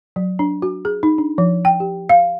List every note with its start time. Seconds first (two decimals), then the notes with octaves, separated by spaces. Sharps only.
0.16 F#3
0.39 D4
0.62 F#4
0.85 G#4
1.03 D#4
1.18 D4
1.38 F3
1.65 G5
1.80 G4
2.09 F5